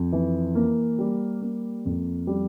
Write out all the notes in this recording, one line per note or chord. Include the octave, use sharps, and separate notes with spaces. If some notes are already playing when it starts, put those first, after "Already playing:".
Already playing: F2
E3
A#3
G3
A#3
F2
G3